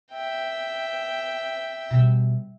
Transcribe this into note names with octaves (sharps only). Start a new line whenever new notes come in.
E5 G5
B2 G3